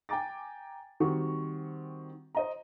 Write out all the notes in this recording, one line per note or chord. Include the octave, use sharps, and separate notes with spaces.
G5 G#5 A#5 D6 A6
D#3 G3 C4 F#4 C#6
C5 D#5 A#5